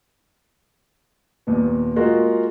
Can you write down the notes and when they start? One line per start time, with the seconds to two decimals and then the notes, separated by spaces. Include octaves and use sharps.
1.47 D#2 A#2 B3
1.96 G#3 A#3 F4 F#4